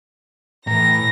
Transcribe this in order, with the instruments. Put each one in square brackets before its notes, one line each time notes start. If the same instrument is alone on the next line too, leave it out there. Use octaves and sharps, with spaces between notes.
[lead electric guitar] A2 [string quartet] E3 A#6 [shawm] A#5